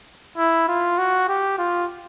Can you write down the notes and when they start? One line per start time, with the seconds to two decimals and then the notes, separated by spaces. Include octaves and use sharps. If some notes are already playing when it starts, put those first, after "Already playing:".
0.38 E4
0.68 F4
0.98 F#4
1.29 G4
1.58 F4